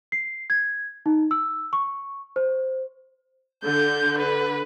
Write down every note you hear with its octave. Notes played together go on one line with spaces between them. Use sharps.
C7
G#6
D#4
E6
C#6
C5
D3 G6
B4